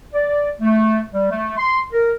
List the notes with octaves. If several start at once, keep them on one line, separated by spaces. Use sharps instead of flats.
D5
A3
G3
A3
C6
A#4